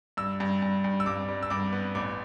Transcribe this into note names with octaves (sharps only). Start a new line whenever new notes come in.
G2 E6
G2
G2
G2
E6
G2 D6
G3
E6
G2 D6
B3
A1 D6